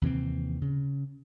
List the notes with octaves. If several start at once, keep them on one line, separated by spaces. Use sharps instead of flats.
D#2 C3 E3 C4
C#3